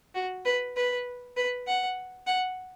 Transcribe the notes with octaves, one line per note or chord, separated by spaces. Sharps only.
F#4
B4
B4
B4
F#5
F#5